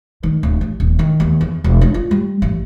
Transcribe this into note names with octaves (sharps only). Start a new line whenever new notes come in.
D#3
D1
A1
D#1
D#3
D#2
E2
E1
D3
F4
G3
A1